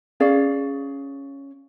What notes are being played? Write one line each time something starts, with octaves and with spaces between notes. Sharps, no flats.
C#4 G#4 D5 F5